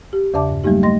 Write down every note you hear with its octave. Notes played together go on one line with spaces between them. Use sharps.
G4
E2 C#3 D5 E5 A5 D6
G2
F#3 G3 A3 A#3 D#4 G4
A3 D#5 C6 A#6